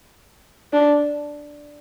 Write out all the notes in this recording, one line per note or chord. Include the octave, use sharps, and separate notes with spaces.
D4